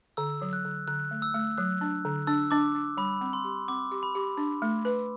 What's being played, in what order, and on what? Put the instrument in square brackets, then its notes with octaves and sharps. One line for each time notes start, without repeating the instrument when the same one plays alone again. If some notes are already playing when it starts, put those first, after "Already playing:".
[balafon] D3 [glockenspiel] E6
[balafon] F#3
[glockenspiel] F#6
[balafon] D3
[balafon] D3 [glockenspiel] F#6
[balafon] A3
[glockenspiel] E6
[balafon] A3
[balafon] F#3 [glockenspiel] F#6
[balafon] D4
D3
[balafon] D4 [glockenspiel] E6
[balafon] D4 [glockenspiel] D6
[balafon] D4
[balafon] G3 [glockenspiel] B5
[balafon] C4
[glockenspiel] C6
[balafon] G4
[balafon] C4 [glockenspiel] D6
[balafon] G4
[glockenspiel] B5
[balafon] G4
D4
A3
B4